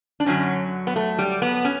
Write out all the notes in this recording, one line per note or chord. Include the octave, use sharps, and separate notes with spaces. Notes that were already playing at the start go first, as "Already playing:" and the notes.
D4
F#2 D3 F#3 C#4
B3
A3
G3
B3
C#4